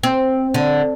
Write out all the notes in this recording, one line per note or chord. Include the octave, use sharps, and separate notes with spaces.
C4
D3